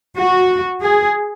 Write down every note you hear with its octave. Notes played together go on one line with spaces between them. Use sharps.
F#4
G#4